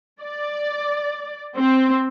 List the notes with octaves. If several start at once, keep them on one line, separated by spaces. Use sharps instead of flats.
D5
C4